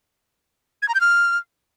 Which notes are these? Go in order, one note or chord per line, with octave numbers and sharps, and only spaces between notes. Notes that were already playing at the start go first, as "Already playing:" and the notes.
G#6
A#5
G6
F6